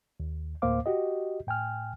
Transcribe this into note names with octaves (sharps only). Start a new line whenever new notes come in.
D#2
D2 A2 A#3 C5 F5 D6
F#4 G4 D#5
A2 G5 G#5 F6